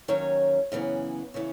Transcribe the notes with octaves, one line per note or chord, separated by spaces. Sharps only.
D#2 D#3 F#3 C#4 C#5
F#2 C#3 E3 B3
C#3 E3 B3